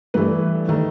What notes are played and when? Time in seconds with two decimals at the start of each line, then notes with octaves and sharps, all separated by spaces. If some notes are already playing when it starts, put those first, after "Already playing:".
0.14 G2 E3 A3 B4
0.69 D#3 A3